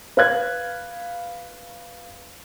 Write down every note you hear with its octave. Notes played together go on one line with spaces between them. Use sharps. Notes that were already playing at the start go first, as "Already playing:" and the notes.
B4 F5 F#6 G#6